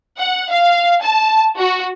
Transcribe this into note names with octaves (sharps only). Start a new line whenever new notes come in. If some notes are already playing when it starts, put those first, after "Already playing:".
F#5
F5
A5
F#4